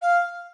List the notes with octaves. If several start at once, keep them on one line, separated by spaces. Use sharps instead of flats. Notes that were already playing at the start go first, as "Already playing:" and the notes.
F5